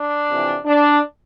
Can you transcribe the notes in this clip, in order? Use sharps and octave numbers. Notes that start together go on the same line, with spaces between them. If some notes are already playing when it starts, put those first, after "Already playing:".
Already playing: D4
F2 C3 E3
D4